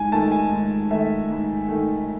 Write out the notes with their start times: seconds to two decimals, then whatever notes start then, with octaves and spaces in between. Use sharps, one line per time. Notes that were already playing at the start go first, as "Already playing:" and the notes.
Already playing: G#2 G#5
0.12 D#3 A3 A5
0.31 G#5
0.51 G#2
0.91 D#3 A3 E5
1.30 G#2
1.68 D#3 A3